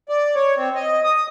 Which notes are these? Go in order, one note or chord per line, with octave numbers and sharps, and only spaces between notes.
D5
C#5
C4
D#5
D#6